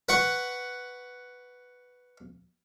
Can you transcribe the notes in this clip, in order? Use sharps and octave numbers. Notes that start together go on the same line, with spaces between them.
B4 F#5 C#6